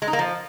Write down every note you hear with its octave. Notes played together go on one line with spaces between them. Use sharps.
G#3
D#4
A#3
F3